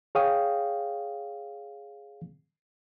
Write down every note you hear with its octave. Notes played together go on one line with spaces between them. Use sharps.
G#4 C#5 F5 G5 D#6